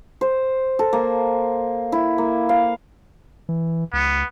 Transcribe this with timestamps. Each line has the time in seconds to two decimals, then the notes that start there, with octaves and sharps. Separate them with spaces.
0.21 C5
0.79 A4
0.93 A#3
1.92 E4
2.18 A#3
2.49 F5
3.49 E3
3.93 C#2 B3